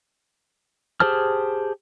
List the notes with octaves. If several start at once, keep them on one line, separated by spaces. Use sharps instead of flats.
G4 G#4 C5 A5 F6